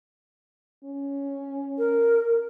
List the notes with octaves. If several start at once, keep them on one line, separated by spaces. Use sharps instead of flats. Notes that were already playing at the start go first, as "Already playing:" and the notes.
C#4
A#4